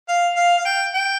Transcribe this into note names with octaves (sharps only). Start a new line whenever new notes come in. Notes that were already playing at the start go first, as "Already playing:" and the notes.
F5
F5
F5
G5
G5